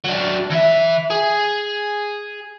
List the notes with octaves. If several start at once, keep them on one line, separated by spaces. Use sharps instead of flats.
F#3 D4
E3 E5
G#4